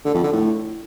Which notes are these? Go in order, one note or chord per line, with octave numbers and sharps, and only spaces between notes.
D3
F2
D3
A2